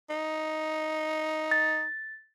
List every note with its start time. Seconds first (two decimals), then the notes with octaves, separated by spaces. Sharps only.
0.10 D#4
1.51 A6